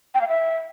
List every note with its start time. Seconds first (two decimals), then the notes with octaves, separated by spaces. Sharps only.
0.15 G5
0.21 F5
0.28 E5